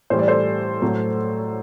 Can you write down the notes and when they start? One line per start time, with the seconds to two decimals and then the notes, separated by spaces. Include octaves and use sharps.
0.10 A2 E3 G3 C5
0.19 D5
0.28 A4 C5
0.82 A2 F#3 A3